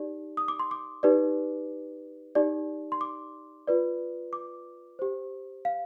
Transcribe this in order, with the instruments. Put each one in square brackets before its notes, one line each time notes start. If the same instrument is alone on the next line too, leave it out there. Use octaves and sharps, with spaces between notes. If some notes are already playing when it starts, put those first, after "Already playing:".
Already playing: [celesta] D#4 G4 D5
D#6
D6
C6
D6
D#4 G4 B4 D5
D#4 G4 D5
C6
D6
F4 B4 D5
D6
G4 C5
F5